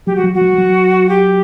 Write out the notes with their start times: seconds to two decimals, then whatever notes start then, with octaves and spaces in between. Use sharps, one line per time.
0.06 F#3 G4
0.16 F#4
0.24 F#3
0.34 F#4
0.41 F#3
0.58 F#3
1.09 G4